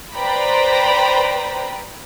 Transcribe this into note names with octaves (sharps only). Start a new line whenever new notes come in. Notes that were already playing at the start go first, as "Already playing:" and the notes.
B4 C5 D5 G5 A#5 B5